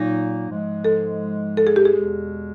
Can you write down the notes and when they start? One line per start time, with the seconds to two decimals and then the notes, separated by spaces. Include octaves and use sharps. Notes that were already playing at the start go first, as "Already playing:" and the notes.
Already playing: A#2 F#3 A#3 D#4
0.48 G#2 F3 G#3
0.85 A4
1.57 A4
1.67 G#4
1.76 G4
1.85 G#4
1.94 E2 B2 G#3